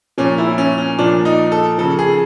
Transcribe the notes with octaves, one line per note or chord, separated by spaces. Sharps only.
A#2 F3 C#4
E4
C#4
C#4
A#2 F3 D4
D#4
A4
C#3 F3 A4
G#4